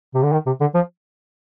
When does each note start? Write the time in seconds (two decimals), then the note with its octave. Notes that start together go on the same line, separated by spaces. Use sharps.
0.14 C3
0.23 D3
0.32 D#3
0.46 C3
0.60 D3
0.74 F3